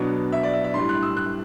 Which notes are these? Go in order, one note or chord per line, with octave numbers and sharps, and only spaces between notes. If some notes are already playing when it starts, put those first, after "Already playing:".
Already playing: B2 F#3 B3 D4
E5
D5
E5
E5
A2 G3 D4 C6
F#6
E6
F#6